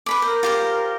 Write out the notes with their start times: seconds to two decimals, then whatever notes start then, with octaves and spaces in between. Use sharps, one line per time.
0.06 B4 B5 D6
0.22 A#4 C5
0.43 F4 G4 C5